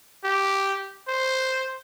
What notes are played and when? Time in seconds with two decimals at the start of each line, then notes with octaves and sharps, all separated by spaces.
0.24 G4
1.08 C5